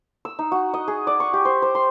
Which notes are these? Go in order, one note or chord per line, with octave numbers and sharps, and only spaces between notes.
E6
D#4
F#4
D#5
G#4
D5
C#6
G4
C5
C5
C6